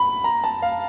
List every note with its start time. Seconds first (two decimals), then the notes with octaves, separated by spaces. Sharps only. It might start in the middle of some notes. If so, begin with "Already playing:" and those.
Already playing: B5
0.24 A#5
0.44 A5
0.62 F5